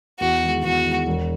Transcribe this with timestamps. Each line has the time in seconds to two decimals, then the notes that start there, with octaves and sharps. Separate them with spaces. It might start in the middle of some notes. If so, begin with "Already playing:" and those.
0.20 E2 F#4
0.42 D#3 G#3
0.63 E2 F#4
0.85 D#3 G#3
1.07 E1